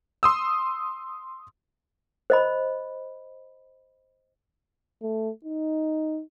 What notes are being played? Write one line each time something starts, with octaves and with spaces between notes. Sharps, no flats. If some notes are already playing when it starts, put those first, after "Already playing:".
C6 D#6 E6
C5 D#5 B5
A3
D#4